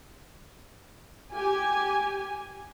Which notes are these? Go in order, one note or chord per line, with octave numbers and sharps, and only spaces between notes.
G4 G#5